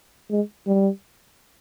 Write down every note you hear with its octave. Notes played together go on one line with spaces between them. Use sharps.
G#3
G3